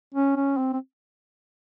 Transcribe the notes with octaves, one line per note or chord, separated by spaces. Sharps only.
C#4
C#4
C4
C4